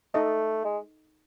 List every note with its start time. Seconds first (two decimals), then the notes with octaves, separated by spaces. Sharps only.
0.14 A3 D#4 A4 D#5
0.65 G#3